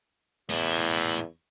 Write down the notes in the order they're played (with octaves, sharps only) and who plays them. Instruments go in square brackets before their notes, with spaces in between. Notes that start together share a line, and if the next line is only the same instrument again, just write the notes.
[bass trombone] E2 [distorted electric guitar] A2 E4